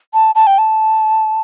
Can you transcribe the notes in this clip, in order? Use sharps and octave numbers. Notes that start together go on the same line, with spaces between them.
A5
A5
G5
A5